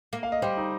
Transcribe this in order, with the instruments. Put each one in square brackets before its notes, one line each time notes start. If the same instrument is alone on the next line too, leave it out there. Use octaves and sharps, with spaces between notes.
[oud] A#3
[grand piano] F5
D#5
[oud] G3 [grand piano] C5
[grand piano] D#4